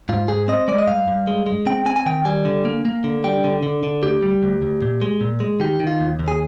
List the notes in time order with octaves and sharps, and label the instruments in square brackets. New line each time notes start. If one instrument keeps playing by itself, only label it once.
[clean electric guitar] G#2 F4
G#2 G#4
C4 D#5
G#3 D5
D#5
G2 F5
G2
G#3
G#3
C4 G5
C4 G#5
G#5
D#3 G5
G3 G#5
D3
A#3
A#3
D3
G3 G5
D3
D3
D3
D2 G4
G3
D2
D2
A#2
G#3
A#2
G#3
D#3 G4
D#3
F4
D#2
D#2
G#4